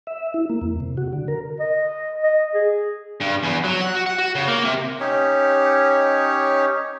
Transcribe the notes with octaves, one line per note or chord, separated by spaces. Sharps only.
E5
E4
A#3
E2
C3
F#4
D3
A#4
D#5
D#5
G#4
G2
E2
F#3
F#5
F#4
F#5
F#4
C#3
A#3
C3
C#4 D#4 G4 C#5